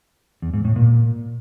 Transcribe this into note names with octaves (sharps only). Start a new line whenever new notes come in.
E2
G#2
A2
A#2